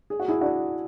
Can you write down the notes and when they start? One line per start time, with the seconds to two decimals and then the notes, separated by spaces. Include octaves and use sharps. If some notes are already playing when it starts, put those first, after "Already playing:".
0.10 G#4
0.20 F#4
0.28 E4 G#4
0.41 D4 F#4